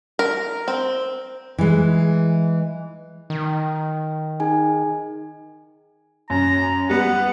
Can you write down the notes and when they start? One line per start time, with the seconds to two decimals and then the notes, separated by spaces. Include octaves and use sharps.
0.19 A#4
0.68 C4
1.58 E3 G#3
3.30 D#3
4.40 D#4 G#4 G#5
6.30 F#2 A#5
6.90 G3 B3 F#5